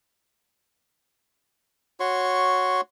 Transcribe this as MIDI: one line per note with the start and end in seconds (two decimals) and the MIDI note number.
2.00 2.81 66
2.00 2.81 73
2.00 2.81 84
2.00 2.81 85